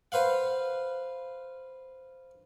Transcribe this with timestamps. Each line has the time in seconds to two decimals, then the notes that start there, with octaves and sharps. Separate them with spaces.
0.12 B4 C5 F5 F#5